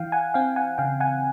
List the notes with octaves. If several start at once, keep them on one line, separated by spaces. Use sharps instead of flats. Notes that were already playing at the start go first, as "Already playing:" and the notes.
Already playing: E3 F5 G5
F#5 G#5
C4 F5 G5
F#5 G#5
C#3 F5 G5
F#5 G#5